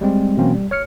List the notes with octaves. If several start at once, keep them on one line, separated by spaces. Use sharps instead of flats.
G3 G#3 C4
B2 E3 F#3 A#3 C4 C#4
G3
C#5 F6 C#7